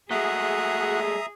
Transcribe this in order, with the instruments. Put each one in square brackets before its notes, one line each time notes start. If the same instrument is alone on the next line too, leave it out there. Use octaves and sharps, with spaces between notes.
[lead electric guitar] G#3 A3 [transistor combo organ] F#4 [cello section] G#4 [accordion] E5 A#5 D#6